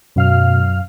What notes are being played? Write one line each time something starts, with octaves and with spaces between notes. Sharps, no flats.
F#2 B2 F5 F6